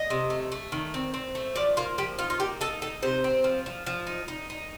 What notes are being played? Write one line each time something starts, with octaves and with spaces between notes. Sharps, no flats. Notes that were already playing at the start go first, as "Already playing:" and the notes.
Already playing: D#5
C3
A3
A3
D#3
C4
C4
A3
F3 D5
A#3 F4
F3 G4
D#4 F4
F4
A#3 G4
D#4 A4
D#4 A4
C3 C5
C4
F3
F3
F3
D#4
D#4
D#4